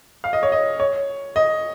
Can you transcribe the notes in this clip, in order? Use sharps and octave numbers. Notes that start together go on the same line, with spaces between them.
F5
D#5
C#5
D#5
C#5
D#5